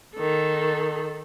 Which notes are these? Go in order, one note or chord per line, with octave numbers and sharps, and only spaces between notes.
D#3 A4